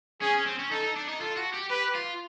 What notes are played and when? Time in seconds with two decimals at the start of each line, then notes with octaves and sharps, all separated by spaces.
0.22 C#4 G#4
0.34 C#4
0.46 C4
0.59 C#4
0.71 D#4 A4
0.83 D#4
0.96 D4
1.08 D#4
1.20 F4 A4
1.37 F#4
1.53 G4
1.70 G4 B4
1.95 F4